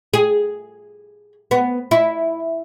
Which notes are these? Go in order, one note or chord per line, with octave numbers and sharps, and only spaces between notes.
G#4
B3
E4